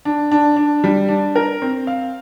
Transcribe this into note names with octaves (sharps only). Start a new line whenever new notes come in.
D4
D4
D4
G3
D4
A#4
C4
F5